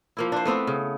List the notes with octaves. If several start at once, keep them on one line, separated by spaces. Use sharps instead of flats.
F3 A#3 E4
D4 C5
A3 B3 C4 D4
C#3